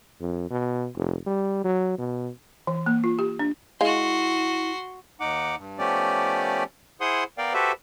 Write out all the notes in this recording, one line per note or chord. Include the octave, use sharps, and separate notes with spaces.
F2
B2
F1
G3
F#3
B2
E3
A#3
F4
G4
D4
G#3 E4 F#4 F5 C6
D#2 D#4 F#5 D6
G2
F3 A3 B3 C#4 G4 D5
E4 G#4 C5 F#5 C6 D#6
B3 A#4 D5 F5 G5
F#4 G4 A4 B4 C5 E5